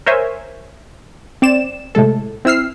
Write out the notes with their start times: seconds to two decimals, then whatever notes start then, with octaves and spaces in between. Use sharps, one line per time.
0.06 A#4 C5 C#5 E5 G#5
1.42 C4 D5 E7
1.95 A2 C3 G#3 A4
2.45 C4 E4 E6 F6 C7